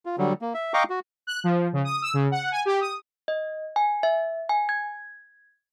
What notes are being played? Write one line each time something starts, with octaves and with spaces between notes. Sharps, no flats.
F4
D3 F#3 G3
A#3
E5
D#5 F5 G5 A#5 C#6 D6
F#4
F#6
F3
C#3
D#6
E6
C#3
F#5
G#5
G4
D#6
D#5
G#5
E5
G#5
G#6